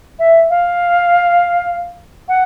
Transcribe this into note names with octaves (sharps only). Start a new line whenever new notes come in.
E5
F5
F#5